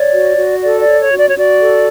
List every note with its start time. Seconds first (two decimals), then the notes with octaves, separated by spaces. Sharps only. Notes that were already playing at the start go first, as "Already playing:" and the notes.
Already playing: C#5 D5
0.14 F#4
0.38 F#4
0.63 A4 D5
0.81 D5
0.87 C#5
1.00 C#5
1.11 F#4
1.18 D5
1.28 C#5
1.36 F#4 D5
1.59 A4